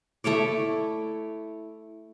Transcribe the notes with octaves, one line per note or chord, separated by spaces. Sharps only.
A3 E4 C#5 D5